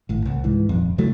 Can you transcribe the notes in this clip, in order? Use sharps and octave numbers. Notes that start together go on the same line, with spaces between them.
G#1 A2
C2
G#2 E3
D#1 F2
C3 E3 F#3 A3